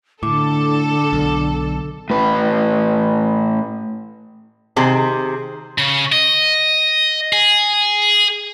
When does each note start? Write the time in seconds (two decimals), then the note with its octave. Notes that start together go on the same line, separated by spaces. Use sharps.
0.23 A2 D3 A4 D6
1.13 B1
2.10 A2 B4
4.76 C3 D#3 G#4 C5
5.78 C#3
6.12 D#5
7.33 G#4